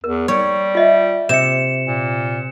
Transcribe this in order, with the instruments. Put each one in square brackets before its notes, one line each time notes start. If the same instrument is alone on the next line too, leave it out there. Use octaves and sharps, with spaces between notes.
[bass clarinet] E2 [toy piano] A#4
[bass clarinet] G3 [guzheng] C#5
[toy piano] F4 D#5 E5
[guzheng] C3 [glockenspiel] C#7 E7
[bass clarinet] A#2